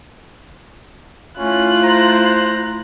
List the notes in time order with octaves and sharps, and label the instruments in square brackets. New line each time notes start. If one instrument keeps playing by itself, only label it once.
[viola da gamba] A3 E4 [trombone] C#4 [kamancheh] F4 F#6
[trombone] C5 [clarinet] A#5